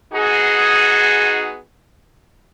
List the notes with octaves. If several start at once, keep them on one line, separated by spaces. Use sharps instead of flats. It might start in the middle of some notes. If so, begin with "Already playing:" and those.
B3 D#4 F#4 G#4